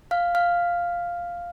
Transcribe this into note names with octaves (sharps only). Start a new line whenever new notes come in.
F5 F6
F5 F6